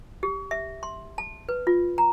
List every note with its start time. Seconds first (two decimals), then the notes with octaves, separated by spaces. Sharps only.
0.23 G4
0.51 E5
0.83 C6
1.18 A5
1.49 B4
1.67 F4
1.98 A#5